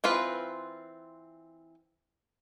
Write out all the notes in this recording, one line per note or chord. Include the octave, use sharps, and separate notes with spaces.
E3 C4 F4 B4